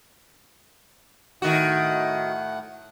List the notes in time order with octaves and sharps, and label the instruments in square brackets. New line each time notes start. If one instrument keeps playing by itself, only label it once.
[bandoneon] A2 F#5 [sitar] D#3 F#4